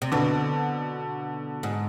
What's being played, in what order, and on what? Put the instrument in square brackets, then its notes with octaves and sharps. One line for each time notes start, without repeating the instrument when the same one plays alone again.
[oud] C3
[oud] B2 [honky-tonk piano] D3
[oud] G#2